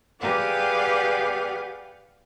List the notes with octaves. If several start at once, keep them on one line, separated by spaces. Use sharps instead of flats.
G4 G#4 B4 D5 F5 F#5